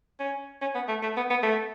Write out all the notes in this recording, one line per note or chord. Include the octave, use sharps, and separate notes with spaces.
C#4
C#4
B3
A3
A3
B3
B3
A3